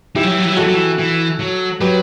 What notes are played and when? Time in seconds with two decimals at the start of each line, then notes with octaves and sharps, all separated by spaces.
0.16 E3 E4 G4
0.24 F#3
0.31 E3
0.38 F#3
0.46 E3
0.52 F#3
0.57 E3 F#4 A4
0.67 F#3
0.75 E3
0.99 E3
1.40 F#3
1.81 F#3 G4 B4